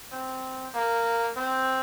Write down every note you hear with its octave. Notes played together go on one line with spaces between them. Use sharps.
C4
A#3
C4